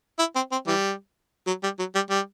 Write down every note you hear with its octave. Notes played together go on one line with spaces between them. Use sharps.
E4
C4
C4
E3 G3
F#3
G3
F#3
G3
G3